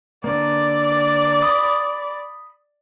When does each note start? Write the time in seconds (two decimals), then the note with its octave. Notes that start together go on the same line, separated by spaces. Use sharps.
0.24 D3 A#3 D5
1.42 B5 D#6